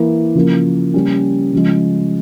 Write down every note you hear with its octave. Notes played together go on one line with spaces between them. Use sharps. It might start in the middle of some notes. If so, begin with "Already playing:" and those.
Already playing: E3 A#3 E4
C#3 F3 A#3
C#3 G3 A#3 C#4
C#3 F3 G#3